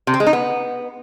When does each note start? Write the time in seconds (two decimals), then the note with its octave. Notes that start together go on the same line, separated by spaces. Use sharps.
0.07 C3
0.14 C4
0.20 G#3
0.27 D#4
0.33 B3